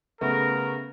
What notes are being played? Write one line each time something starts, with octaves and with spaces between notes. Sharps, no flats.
C#3 A3 B3 A#4